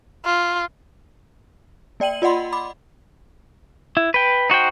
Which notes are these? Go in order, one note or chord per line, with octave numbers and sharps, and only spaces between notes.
F4
A#3 D5 G5 D#7 F#7
F4 D5 D#5 F#5 B5 C6
B5 D6
E4
B4 G5
D#4 F#4 C5 G5